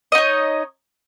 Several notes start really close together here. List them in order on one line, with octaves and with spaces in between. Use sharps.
D#5 D#4 C#5